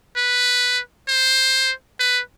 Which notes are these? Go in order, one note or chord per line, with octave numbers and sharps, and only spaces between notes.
B4
C5
B4